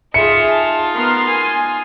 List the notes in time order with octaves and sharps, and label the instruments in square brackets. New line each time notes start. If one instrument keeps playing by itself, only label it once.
[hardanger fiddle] D#4 F4 [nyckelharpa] G#4 E5 [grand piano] C#7
[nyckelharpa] A5
[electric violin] B3 A#4 [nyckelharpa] C6
[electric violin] G#5